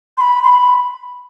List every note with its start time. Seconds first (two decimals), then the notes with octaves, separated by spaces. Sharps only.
0.18 C6
0.21 B5
0.44 C6
0.48 B5